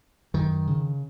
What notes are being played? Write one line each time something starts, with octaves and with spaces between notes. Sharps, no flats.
F#2 D#3
C#3